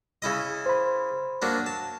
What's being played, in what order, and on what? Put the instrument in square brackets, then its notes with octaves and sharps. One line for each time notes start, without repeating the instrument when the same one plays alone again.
[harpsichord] C#3 E4 D#5
[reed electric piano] C5 B5
[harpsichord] F#3 A#3 D4
A5